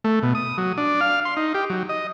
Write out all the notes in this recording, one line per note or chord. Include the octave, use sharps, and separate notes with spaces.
A3
B2
D#6
F#3
D4
F5
C6
D#4
G4
F#3
D#5